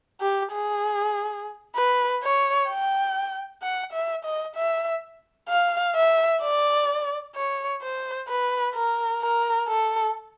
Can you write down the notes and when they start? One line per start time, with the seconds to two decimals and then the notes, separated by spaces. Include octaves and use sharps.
0.21 G4
0.52 G#4
1.76 B4
2.23 C#5
2.69 G5
3.62 F#5
3.93 E5
4.25 D#5
4.56 E5
5.49 F5
5.95 E5
6.42 D5
7.35 C#5
7.82 C5
8.28 B4
8.75 A#4
9.22 A#4
9.68 A4